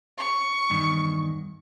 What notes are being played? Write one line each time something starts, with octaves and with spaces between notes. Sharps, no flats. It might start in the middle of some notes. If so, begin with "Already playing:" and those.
C#6
E2 G2 D#3